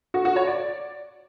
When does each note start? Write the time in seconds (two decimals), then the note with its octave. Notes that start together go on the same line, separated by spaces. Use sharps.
0.14 F#4
0.25 F#4
0.36 C#5
0.47 D5